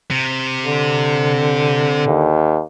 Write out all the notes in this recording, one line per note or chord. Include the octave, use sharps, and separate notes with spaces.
C3
D3
D#2